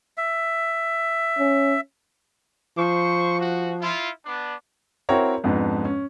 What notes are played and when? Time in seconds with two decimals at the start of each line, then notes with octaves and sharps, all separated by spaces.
0.18 E5
1.39 C#4
2.78 F3 C5 C#6
3.37 F#4
3.80 E4 F4
4.24 B3 D4
5.09 C4 E4 F#4 A#4 C#5 A#5
5.44 F2 G#2 B3 D4
5.85 C#4